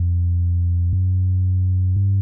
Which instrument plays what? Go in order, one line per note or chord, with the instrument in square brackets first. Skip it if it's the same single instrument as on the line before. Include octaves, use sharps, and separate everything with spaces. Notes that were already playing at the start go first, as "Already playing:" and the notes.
Already playing: [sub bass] F2
F#2
G2